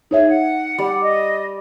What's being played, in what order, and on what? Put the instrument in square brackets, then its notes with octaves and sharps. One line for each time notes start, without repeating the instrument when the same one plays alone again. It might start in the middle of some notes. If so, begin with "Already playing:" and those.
[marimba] D#4 C#5 E5 [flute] G#4
[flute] F#5
[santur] G3 D5
[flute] D#5